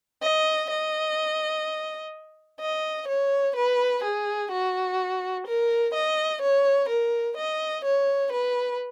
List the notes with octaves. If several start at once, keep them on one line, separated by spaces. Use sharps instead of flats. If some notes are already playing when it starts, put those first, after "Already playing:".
D#5
D#5
D#5
C#5
B4
G#4
F#4
A#4
D#5
C#5
A#4
D#5
C#5
B4